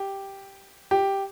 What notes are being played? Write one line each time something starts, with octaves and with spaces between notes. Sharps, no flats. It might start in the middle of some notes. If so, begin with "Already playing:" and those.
Already playing: G4
G4